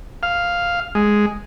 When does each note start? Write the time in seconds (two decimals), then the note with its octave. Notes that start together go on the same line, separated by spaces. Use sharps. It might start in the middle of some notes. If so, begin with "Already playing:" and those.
0.23 F5
0.95 G#3